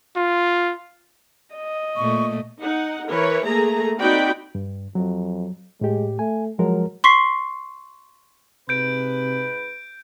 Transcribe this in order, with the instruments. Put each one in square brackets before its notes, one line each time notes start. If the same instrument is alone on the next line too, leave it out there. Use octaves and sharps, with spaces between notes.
[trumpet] F4
[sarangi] D#5
[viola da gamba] A#2 A3 [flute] C#6
[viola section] D#4 F#5
E3 A#4 B4 C#5
A3 A#3 G#4 A#5
C4 D#4 F#4 D5 G5 B5
[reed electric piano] G2
[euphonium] F2 [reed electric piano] F#3
[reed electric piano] A2 G4 [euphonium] G#3
[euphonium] A3 [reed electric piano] G#5
[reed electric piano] F3 G#3 A#4 [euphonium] F#3
[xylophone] C6 C#6 B6 C7
[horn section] G#2 B4 [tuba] C3 [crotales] G6 D7